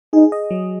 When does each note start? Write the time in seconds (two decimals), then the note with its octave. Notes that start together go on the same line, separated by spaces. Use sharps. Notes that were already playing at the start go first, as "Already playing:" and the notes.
0.13 D#4 G#4
0.32 D#5
0.51 F#3